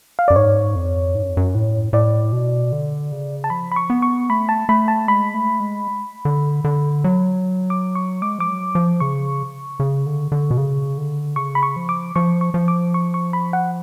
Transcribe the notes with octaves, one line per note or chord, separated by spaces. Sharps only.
F5
F#2 D5
G#2 C#5
F2
G#2
F#2
F2
F#2
A2
A2 D5
B2
D3
C#3
A5
F3 B5
B5
C#6
B3
C#6
A3 B5
A5
A3 B5
A5
G#3 B5
A3
G#3
D3
D3
F#3
D6
C#6
G#3 D6
F3 D6
F#3
F3
C#3 C#6
C#3
D3
D3
B2
C#3
D3
C#3 C#6
B5
C#6
F3
D6
F3 C#6
C#6
F3
D6
C#6
C#6
B5
F#5